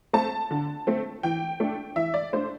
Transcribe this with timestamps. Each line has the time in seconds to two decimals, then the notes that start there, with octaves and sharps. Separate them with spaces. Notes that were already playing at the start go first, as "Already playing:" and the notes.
0.13 A3 C4 A5
0.51 D3
0.87 A3 C4
1.23 E3 G5
1.60 A3 D4
1.96 E3 E5
2.14 D5
2.33 A3 D4 C5